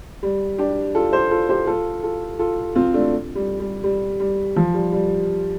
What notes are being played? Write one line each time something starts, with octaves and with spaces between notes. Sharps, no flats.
G3
D4 G4
F4 A4
G4 C5
F4 A4
G4 C5
F4 A4
F4 A4
F4 A4
C4 F4
A3 D4
G3
G3
G3
G3
F3
G3
G3